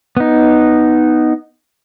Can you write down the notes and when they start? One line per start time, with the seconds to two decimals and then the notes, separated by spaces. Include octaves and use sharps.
0.17 B3 D#4